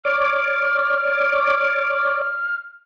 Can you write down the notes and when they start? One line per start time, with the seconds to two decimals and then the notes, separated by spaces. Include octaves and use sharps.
0.05 C#5 D5 D6 F6